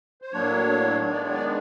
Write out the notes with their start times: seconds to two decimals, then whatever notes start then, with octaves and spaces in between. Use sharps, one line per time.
0.22 C5
0.32 A2 F#3 A#3 D4 C#5
1.01 D#3 G#3 B3 D4 C#5
1.12 D5
1.23 C#5
1.34 D5